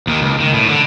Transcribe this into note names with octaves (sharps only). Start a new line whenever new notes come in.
D#2 D#3
C#2
D#3
A2
D3